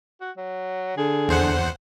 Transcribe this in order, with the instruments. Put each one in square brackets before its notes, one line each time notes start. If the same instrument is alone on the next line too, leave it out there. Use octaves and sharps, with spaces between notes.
[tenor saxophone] F#4
F#3
[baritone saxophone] D3 [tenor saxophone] G#4
[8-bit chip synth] E2 C5 F#5